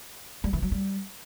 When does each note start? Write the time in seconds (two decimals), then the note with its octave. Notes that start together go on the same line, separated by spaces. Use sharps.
0.44 G3
0.53 E3
0.62 F#3
0.72 G3